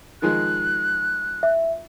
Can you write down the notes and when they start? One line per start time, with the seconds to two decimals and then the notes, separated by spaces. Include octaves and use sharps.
0.22 D#3 F3 G#3 F#6
1.43 E5